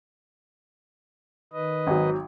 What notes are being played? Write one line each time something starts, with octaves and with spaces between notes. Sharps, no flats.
D#3 B4 D#5
G#1 F#3